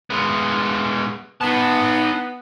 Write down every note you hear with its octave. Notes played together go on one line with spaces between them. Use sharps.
G#3 B3
B3 D#4 A5